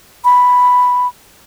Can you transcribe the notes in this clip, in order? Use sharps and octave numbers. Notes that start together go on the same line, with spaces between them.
B5